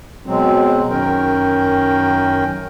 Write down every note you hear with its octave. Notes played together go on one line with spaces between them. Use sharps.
B2 F#3 G#3 C4
F#2 D#3 C#4 A#4 G5